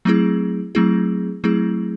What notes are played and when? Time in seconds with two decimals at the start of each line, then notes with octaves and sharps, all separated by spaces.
0.05 F#3 A3 C4 E4 G#4
0.75 F#3 A3 C4 E4 G#4
1.44 F#3 A3 C4 E4 G#4